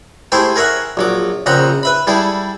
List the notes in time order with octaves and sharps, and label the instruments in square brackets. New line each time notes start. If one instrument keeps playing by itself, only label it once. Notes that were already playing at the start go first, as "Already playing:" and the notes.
[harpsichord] A3 E4 G4 G#4 C5
G#4 A#4 C#5 E5 F#5
A#1 F#3 D6
A#1 C#3 C4 F#5 A#5
B4 E5 B5
G3 E4 G#4 A4